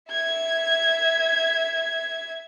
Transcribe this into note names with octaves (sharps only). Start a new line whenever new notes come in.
E5 G#6